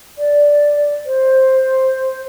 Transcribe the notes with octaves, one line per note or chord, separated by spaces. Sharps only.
D5
C5